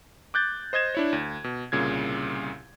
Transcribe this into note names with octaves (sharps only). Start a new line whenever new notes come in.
D6 F#6 G6 A6
C5 D#5 G6 G#6 E7
D4 E4 C#5
D2
B2
C2 A#2 C#3 G#6